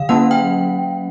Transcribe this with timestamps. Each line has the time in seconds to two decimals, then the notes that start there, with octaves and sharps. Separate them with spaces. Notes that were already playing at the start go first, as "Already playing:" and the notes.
Already playing: D3 F5
0.09 F#3 A#3 C#4 F#5
0.31 G5